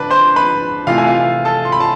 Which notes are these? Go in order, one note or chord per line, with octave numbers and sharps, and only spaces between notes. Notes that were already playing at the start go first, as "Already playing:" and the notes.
Already playing: D3 D4 B4 A5 B5
C5 C6
B4 B5
C3 E3 A3 F4 F5
G#5
F4 F5
A4 A5
C6
B5
A5